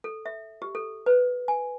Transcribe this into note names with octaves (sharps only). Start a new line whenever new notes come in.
A4
E5
G4
A4
B4
G#5